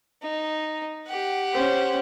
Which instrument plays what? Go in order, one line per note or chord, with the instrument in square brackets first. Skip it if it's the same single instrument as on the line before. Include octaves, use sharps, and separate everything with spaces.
[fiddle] D#4
G4 F#5
[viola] C#4 C5